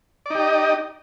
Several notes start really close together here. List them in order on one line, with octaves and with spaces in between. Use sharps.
D5 D#4 G4 D#5